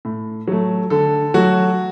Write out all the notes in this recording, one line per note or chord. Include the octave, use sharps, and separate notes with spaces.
A2
F#3 A3
D3 A4
F#3 A3 F#4